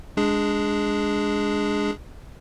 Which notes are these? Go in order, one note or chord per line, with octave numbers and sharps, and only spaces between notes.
G#3 D4 G#4